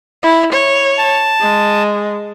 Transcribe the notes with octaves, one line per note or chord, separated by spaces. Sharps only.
E4
C#5
A5
G#3